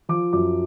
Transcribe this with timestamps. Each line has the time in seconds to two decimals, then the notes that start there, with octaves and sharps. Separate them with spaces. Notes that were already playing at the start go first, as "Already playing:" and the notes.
0.09 F3 D6
0.33 F#2 D6